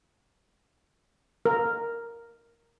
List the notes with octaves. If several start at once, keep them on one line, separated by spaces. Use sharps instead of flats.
A#4